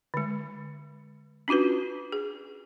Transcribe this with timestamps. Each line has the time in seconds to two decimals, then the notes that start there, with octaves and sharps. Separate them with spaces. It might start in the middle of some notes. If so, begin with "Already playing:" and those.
0.14 D3 G#3
1.48 C#4 D4 F4 F#4 B4
2.12 G#4